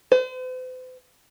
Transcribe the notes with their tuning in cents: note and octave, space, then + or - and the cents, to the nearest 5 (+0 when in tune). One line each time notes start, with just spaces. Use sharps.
C5 -45